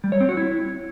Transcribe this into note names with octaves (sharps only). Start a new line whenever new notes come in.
G3
C#5
C4
F#4
E4